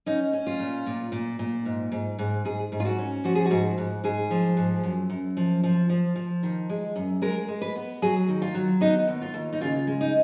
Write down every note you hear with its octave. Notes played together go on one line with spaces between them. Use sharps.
C#4 D#4
C#4
F4
A#2
A#2
A#2
A#2
G#2
G#2
G#2
G#2 G#4
G#2
F4
F#4
C#4
F3 F#4
G#4
F#4
G#2
G#2
G#2 G#4
F3
G#2
F#2
F#2
F3
F3
F3
F3
D#3
G#3
F#2
G#3 A#4
G#3
B4
B3
F#3 G#4
D#3
F4
F#3
B3 D#4
D#2
F4
D#2
D#4
C#3 F4
G#3
D#4